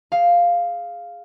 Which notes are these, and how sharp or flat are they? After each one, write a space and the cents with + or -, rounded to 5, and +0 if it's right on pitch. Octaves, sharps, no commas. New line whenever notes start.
G#4 +0 F5 +0